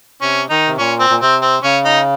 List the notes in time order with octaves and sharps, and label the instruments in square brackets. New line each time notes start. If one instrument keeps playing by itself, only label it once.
[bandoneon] C3 [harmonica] C#4
[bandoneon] D#3 [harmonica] D#4
[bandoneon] C3
[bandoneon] A#2 [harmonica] C#4
[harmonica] C4
[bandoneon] A#2
[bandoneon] C3 [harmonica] C4
[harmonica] C4
[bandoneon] C#3 [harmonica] C#4
[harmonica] D#4